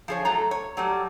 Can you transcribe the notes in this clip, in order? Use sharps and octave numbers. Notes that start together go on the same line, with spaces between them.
F3 G#4 C#5
A2 F#3 A3 A4 A#5
C#5
F#3 G3 A3